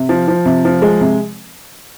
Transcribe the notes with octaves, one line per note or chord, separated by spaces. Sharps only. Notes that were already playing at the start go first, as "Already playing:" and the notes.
Already playing: C3
F3
F3
C3
F3
G#3
C3